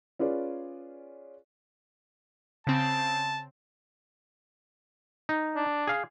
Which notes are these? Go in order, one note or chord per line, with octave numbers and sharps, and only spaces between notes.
C#4 F4 G#4 B4 D5
C#3 C4 A5
D#4
D4
G#4 F5